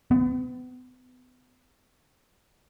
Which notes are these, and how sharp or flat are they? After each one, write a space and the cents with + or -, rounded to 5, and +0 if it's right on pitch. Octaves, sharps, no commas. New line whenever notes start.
B3 +35